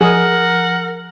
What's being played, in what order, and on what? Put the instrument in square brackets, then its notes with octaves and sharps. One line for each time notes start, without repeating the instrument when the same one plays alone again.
[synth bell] F3 [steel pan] G#4 [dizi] A#4 [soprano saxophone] F#5